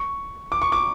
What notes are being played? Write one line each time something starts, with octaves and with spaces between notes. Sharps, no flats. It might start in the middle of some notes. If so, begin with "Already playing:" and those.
Already playing: C#6
D6
C#6
D6